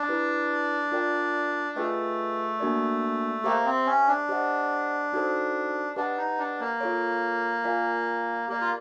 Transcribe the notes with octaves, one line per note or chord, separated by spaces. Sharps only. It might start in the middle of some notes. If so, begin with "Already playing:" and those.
Already playing: D4
E4 G4 B4
F4 A#4 D5 G5
A3 F4 G#4 B4 D#5 G5
A#3 D4 F#4 A#4 D5
A#3 G4 C5 E5 G5
C4
C#4
D4
G4 C5 D#5 F#5
D#4 F#4 A4 C5
D4 G4 B4 D#5 F#5 A5
D#4
D4
A#3
F4 A4 C#5
F4 A#4 D5 F5 G#5
A#3 G4 A#4 D5
F4